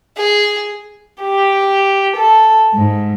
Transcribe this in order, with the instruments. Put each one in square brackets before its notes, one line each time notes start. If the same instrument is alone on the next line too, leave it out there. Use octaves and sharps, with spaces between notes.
[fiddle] G#4
[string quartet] G4
A4
G#2